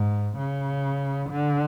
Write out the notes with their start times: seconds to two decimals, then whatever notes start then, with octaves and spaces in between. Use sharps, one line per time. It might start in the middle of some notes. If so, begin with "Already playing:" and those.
Already playing: G#2
0.38 C#3
1.30 D3